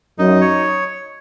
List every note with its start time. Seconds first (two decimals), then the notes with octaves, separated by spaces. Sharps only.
0.18 F#2 D#4
0.41 C#5